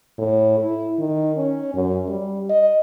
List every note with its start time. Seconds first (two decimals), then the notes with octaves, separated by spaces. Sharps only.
0.19 A2
0.59 E4
0.99 D#3
1.37 C#4
1.75 F#2
2.09 G3
2.50 D#5